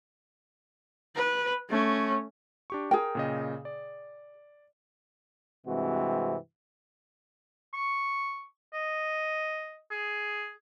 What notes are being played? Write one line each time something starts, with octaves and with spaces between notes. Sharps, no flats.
B4
A3 C#4
D4 G4 C#6
G#4 A#4 G5
A#2 C#3 D#5
D5
G2 C3 E3 G#3 C4 F#4
C#6
D#5
G#4